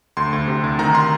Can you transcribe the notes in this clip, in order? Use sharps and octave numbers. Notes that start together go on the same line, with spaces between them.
D2 C6
D2
C3
D2
D#3 A#5
C6